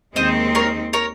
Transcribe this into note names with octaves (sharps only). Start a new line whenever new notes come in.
D#2 D#3 G#3 C4 D#4 C5 D#5
A#4 C#5
A#4 C#5